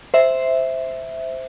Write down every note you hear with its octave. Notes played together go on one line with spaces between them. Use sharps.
C5 E5